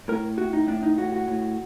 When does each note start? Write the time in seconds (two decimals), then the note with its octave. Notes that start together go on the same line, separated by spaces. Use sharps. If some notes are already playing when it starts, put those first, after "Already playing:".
0.08 A2 A#4
0.37 A2 F#4
0.53 D#4
0.67 A2 D4
0.83 D#4
0.97 A2 F#4
1.12 F#4
1.27 A2